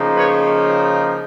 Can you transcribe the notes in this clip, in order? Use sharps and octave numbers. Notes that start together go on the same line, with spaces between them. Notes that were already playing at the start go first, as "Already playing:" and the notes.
Already playing: C#3 F3 A#3 D#4
B4 C#5